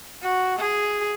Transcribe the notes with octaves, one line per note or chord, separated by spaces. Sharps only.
F#4
G#4